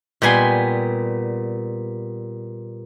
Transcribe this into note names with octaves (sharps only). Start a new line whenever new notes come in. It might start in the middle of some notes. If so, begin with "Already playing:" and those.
A#2 G3 B3 G#5 C6